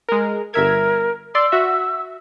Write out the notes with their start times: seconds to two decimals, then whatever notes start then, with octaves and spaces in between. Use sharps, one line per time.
0.09 G#3 A#4
0.54 G1 A#4 E5 G#6
1.35 D5 C6 E6
1.52 F#4 E5